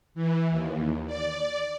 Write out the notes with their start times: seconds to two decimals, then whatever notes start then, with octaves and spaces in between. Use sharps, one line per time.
0.15 E3
0.51 D#2
1.07 D5